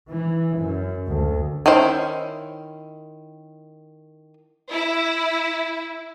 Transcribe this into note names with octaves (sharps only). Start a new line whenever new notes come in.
E3
F#2
D2
D#3 C#4 E4 C5
E4